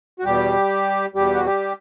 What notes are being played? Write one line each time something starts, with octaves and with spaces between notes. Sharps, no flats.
F#4
E2 B2 G3 G4
E2 B2 G3 G4
F#4
G3 G4